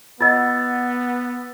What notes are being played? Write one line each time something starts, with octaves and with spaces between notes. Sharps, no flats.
B3 F4 D#5 F#5 E6 A6